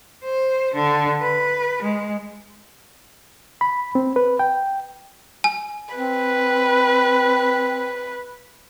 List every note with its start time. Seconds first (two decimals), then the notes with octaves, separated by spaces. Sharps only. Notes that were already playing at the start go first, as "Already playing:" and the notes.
0.24 C5
0.74 D3
1.22 B4
1.82 G#3
3.61 B5
3.95 C4
4.16 B4
4.39 G5
5.44 G#5
5.95 C4 B4